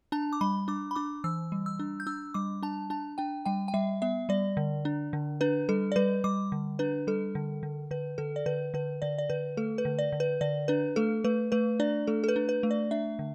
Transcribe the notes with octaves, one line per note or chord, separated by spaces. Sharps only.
D4 A5
D6
G3 B5
D4 D6
B5
D4 D6
E3 E6
G3
E6
D4
G6
D4 E6
G3 D6
D4 A5
D4 A5
D4 G5
G3 G5
G5
G3 E5
B3 E5
G3 D5
D3
D4
D3
D4 B4
G3 A4
D5
G3 B4
G3 D6
D3
D4 B4
G3 A4
D3
D3
D3 B4
D3 A4
D5
D3 B4
D3 B4
D3 D5
D5
D3 B4
A3 A4
B4
D3
D5
D3
B4
D3 D5
D4 B4
A3 A4
A3 B4
A3 B4
D4 D5
A3 A4
A4
B4
D4
B4
A3
D5
D4 E5
D3